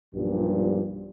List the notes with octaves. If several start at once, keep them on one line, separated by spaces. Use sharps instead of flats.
B1 G2 A#2 F3 G3